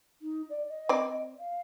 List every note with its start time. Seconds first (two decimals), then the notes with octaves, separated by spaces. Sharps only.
0.22 D#4
0.50 D5
0.69 D#5
0.89 C4 D5
1.40 F5